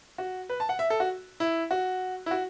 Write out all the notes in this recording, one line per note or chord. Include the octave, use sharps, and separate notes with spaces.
F#4
B4
A5
F#5
E5
A4
F#4
E4
F#4
E4
F#4